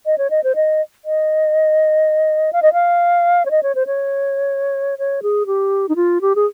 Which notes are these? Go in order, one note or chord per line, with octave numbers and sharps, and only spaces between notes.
D#5
C#5
D#5
C5
D#5
D#5
F5
D#5
F5
C#5
D#5
C#5
C5
C#5
C#5
G#4
G4
D#4
F4
G4
G#4